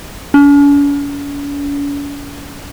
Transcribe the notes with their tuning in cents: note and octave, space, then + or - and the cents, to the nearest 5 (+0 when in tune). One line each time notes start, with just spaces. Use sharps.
C#4 +45